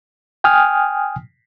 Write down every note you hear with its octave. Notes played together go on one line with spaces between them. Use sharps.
G5 G#5 D#6 F6